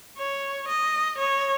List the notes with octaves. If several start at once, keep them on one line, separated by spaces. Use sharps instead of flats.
C#5
D#5
C#5